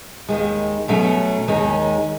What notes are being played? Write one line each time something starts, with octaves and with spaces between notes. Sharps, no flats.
D#2 D#3 G#3
B2 F#3 A3 C#4
D#2 D#3 G#3 C#4